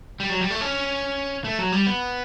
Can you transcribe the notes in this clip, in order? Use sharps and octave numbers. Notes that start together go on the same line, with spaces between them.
G3
F#3
G3
A3
C#4
A3
F#3
G3
B3